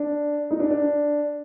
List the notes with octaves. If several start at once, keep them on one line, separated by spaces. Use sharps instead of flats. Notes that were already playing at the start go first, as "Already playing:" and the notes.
Already playing: D4
D#4
D4
D4